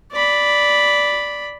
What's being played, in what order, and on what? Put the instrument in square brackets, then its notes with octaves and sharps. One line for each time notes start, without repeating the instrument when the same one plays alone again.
[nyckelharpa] D5 B5